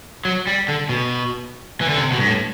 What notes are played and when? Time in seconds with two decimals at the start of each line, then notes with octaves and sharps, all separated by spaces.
0.25 F#3
0.47 G3
0.68 D3
0.89 B2
1.81 E3
1.89 D3
1.98 C3
2.12 B2
2.19 G2
2.26 A2